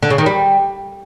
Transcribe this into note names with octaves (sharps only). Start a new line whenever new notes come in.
D3
C#3
D#3
G3